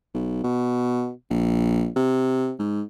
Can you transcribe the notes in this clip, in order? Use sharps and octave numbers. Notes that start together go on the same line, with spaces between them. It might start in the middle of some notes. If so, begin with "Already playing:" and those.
B1
B2
A#1
C3
G#2